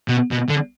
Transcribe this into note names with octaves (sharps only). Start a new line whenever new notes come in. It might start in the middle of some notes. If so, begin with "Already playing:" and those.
B2
B2
D3